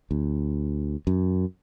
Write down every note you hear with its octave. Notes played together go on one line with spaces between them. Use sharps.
D2
F#2